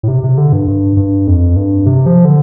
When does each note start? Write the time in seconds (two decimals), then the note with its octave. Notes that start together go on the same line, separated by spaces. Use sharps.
0.03 A2
0.08 C3
0.24 C3
0.38 D3
0.53 G2
0.68 G2
0.97 G2
1.27 F2
1.56 G2
1.86 C3
2.06 F3
2.25 D3